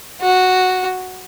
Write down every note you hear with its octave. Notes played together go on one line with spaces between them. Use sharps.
F#4